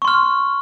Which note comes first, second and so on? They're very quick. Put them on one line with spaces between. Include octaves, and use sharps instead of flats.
C#6 C6 F6